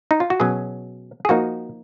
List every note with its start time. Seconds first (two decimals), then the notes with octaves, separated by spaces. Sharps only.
0.11 D#4
0.20 F4
0.30 F#4
0.40 B2 F#3 C#4 G#4
1.25 G#4
1.29 F3 A#3 D#4 F#4